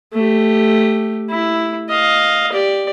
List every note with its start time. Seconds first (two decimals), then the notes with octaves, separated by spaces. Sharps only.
0.13 A3 G4
1.30 E4
1.89 D#5 F5
2.52 G4 D5